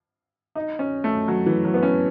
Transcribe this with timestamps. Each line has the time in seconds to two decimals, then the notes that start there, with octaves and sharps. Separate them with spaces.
0.56 D#4
0.79 C#4
1.04 A3
1.28 F#3
1.46 E3
1.65 F#3
1.74 B3
1.83 C#4